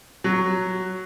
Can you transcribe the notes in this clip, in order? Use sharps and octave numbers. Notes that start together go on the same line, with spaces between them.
F#3